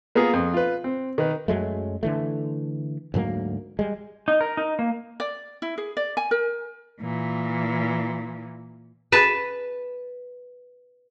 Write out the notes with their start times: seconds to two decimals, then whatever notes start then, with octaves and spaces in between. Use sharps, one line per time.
0.15 A#3 B3 F4 G#4 A#4
0.33 F2
0.53 F4 B4
0.84 C4
1.18 D#3 B4
1.48 F#2 F#3 G#3 A3
2.03 D3 E3 A3
3.14 D2 G#2 F#3 A#3
3.79 G3 G#3
4.28 D#4
4.41 A#4
4.57 D#4
4.79 A#3
5.20 D5
5.62 E4
5.78 G#4
5.97 D5
6.17 G#5
6.31 A#4
7.01 A#2 E3
9.12 B4 A5